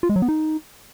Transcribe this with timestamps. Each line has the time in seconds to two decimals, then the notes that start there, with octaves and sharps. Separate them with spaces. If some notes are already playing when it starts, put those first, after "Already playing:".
0.03 F4
0.09 G#3
0.16 F#3
0.22 B3
0.29 D#4